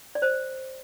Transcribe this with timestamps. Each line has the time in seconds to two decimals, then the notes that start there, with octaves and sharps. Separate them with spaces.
0.15 D5
0.22 C5